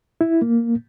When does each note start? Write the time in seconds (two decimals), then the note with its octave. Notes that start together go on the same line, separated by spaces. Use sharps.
0.21 E4
0.42 A#3